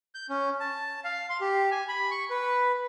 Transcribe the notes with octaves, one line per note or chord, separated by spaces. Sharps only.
G6
C#4
A5
F5
C6
G4
G#5
B5
C#6
B4